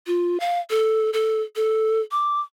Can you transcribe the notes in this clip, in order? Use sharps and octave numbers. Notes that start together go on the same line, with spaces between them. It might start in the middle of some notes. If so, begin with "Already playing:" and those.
F4
F5
A4
A4
A4
D6